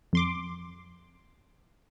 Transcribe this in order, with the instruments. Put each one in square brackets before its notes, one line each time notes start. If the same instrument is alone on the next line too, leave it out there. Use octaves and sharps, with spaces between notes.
[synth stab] F2 C6 D6